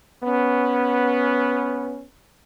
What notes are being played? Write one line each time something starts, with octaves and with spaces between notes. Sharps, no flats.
B3 C#4